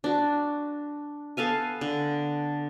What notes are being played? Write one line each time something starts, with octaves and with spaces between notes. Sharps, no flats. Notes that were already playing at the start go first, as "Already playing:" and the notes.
D4 F#4
B3 A4 F5 G#5
D3